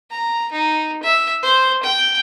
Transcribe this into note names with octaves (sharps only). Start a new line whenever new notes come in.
A#5
D#4
E5
C5
G5